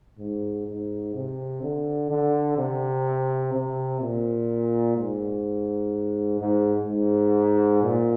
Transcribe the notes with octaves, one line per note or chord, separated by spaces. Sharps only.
G#2
G#2
C3
D3
D3
C3
C3
A#2
G#2
G#2
G#2
A#2